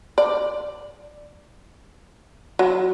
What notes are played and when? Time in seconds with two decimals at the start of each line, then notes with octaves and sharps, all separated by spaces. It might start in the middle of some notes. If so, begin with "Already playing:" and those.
0.18 D5
2.59 F#3